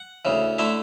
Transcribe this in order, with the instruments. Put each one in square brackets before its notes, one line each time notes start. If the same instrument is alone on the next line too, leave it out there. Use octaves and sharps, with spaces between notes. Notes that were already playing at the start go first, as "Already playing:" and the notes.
Already playing: [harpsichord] F#5
D2 C#3 E3
D3 A3 E4 E5